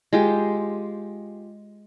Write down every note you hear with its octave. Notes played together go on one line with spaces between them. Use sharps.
G#3 F4 G4